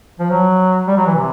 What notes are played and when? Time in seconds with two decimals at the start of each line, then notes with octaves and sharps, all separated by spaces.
0.19 F3
0.30 F#3
0.87 G3
0.97 F#3
1.07 E3
1.15 C3